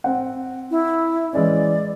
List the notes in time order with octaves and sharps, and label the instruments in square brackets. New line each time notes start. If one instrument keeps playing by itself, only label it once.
[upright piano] C4 F#5
[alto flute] E4
[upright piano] E3 G#3 C#4 [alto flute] D5